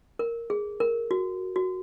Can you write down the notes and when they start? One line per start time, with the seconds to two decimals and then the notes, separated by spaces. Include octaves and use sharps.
0.19 A#4
0.50 G#4
0.80 A#4
1.11 F#4
1.56 F#4